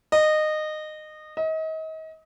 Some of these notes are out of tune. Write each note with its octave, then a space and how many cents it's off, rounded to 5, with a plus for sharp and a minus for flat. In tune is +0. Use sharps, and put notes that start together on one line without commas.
D#5 -20
D#5 +35